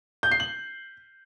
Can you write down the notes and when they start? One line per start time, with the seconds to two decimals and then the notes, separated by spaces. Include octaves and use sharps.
0.23 G6
0.31 C7
0.40 F#7